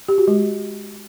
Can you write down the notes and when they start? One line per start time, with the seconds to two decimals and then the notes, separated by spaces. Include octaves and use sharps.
0.08 G4
0.18 F#4
0.28 G#3